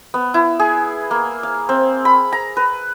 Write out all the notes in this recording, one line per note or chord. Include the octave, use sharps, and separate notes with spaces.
B3
E4
G#4
A#3
F5
C4
B5
A#5
B4